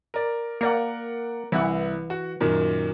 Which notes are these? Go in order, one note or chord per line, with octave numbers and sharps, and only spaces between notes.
A#4 D5
A#3 A#4 D5 F#5
C2 E3 E4 F#5
F#4
F#2 A#2 D#3